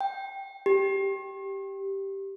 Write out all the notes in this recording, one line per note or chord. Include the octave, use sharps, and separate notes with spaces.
G5
G4